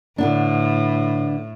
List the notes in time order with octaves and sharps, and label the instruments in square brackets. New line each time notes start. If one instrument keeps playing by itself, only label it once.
[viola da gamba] A2 [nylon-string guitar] D3 B3 D4